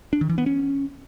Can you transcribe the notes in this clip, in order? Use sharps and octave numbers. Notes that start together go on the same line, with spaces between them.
D4
D#3
E3
B3
C#4